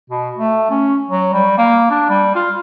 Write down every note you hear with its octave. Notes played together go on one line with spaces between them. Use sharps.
B2
A3
C#4
F#3
G3
A#3
D4
G3
F4